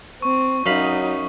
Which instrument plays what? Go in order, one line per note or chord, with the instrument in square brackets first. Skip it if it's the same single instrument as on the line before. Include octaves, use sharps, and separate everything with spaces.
[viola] C4 [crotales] C#6
[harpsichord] F#2 F5 B5 [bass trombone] F#3 [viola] D#4